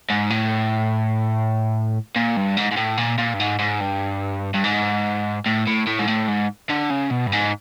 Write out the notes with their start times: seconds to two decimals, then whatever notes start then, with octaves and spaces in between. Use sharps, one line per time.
0.10 G#2
0.30 A2
2.16 A#2
2.36 G2
2.57 G#2
2.72 G#2
2.77 A2
2.98 A#2
3.19 A#2
3.34 G2
3.40 G#2
3.59 G#2
3.81 G2
4.54 G2
4.64 G#2
5.46 A2
5.67 A2
5.87 A2
5.99 G#2
6.07 A2
6.28 G#2
6.70 D3
6.90 C#3
7.11 B2
7.27 G2
7.32 G#2